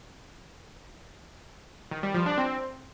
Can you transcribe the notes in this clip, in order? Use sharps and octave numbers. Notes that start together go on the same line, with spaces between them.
D#3
G3
F3
D4
C4